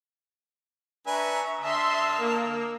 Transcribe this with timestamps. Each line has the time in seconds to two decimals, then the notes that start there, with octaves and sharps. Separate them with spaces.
1.07 D4 B4 E5 G#5 A#5 C#6
1.62 D3 D#5 E5 A5 C6 E6 F6
2.18 A#3